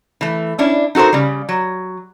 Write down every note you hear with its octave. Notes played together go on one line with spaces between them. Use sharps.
E3 A3
C#4 D4 E4
D#4 F#4 A4 A#4 C5
C#3 G3
F#3